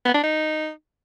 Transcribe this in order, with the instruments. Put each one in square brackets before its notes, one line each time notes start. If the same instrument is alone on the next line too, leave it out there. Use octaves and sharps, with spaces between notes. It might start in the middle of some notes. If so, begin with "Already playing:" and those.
[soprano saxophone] B3
D4
D#4